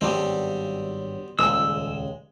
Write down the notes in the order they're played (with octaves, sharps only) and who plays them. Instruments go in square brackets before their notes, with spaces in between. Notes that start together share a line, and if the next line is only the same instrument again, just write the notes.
[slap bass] G#1 G2 F#3 [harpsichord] G3 B3 C4
[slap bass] D#1 C#2 [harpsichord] G#3 [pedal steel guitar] E6